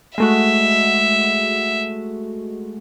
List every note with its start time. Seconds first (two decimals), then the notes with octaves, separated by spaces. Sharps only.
0.18 G#3 A3 F#4 E5